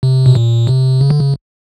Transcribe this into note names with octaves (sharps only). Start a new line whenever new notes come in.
C3
B2
A#2
C3
C#3
D3
C#3